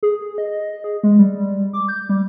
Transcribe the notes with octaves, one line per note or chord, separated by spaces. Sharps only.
G#4
D#5
G#4
G#3
G3
D6
G6
G3